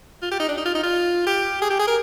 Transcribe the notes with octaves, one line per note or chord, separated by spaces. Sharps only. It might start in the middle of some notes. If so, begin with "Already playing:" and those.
F4
G4
D#4
D4
D#4
F4
D#4
F4
G4
G#4
G4
G#4
A#4